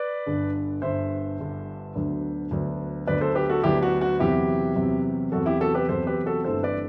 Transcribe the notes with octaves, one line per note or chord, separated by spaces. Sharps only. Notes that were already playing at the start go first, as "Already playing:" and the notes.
Already playing: B4 D5
G1 G2 D3
G1 G2 D3 C5 E5
G1 G2 D3
D2 D3 F#3 B3 D4
D2 D3 F#3 B3 D4
D2 D3 F#3 B3 D4 B4 D5
A4 C5
G4 B4
F#4 A4
D2 D3 F#3 B3 D4 E4 G4
F#4
F#4
E2 C3 F#3 E4 G4
E2 C3 F#3
E2 C3 F#3 F#4 A4
E4 G4
F#4 A4
G4 B4
E2 C3 F#3 A4 C5
G4 B4
F#4 A4
G1 G2 E3 A3 C4 A4 C5
B4 D5